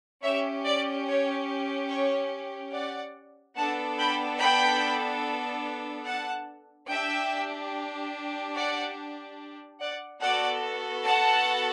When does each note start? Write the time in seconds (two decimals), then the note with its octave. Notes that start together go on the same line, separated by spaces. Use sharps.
0.23 C#4 G4 C#5 E5
0.65 D5
1.07 C#5
1.90 C#5
2.73 D5 F#5
3.56 B3 D4 A4 F#5 A5
3.98 G5 B5
4.40 G5 B5
6.05 F#5 A5
6.89 D4 G4 E5 G5
8.55 D5 F#5
9.80 D5 F#5
10.22 B3 F#4 A4 D5 F#5
11.05 F#5 A5